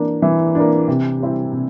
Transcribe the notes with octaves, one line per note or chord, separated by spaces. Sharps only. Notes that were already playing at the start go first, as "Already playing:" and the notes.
Already playing: E3 A#3 D4
E3
A#3 D4
C3
G3 C4 E4
C3